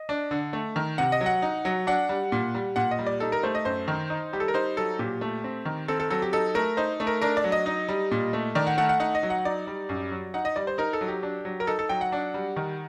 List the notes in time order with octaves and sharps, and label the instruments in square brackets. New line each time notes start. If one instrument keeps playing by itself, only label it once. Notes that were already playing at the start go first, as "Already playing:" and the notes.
Already playing: [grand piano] D#5
D4
D3
A3
D#3
C3 F#5
D#5
F#3
F#5
D#4
F#3
D4 F#5
G3
A#2
G3
A#2 F#5
D#5
G3
D5
D#4 A4
A#4
A3 C5
D#5
F#2 C5
D#3
D#4
G3 G4
A4
A#4
D#4 C5
F#3 A4
A#2 G4
A3
C4
D#3
C4 A4
A4
F#3 A4
G4
D#4 A4
A3 A#4
D#4 C5
A3
A#4
D4 A#4
D5
F#3
D#5
D#4
G3
A#2
A3
D#3 D5
F#5
A3 F#5
F#5
D#4 F#5
D#5
F#3
F#5
D#4 D5
G3
F#2
F#3
D#4 F#5
D#5
G3 D5
C5
D#4 A#4
A4
F#3
G4
D4
F#3
A#4
D#4 A4
A4
F#3 G5
F#5
D4
G3
D#3